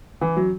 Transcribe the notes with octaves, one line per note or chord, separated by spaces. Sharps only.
E3
F#3